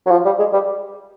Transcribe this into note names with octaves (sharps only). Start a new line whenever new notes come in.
F#3
F3
G3
G#3
G3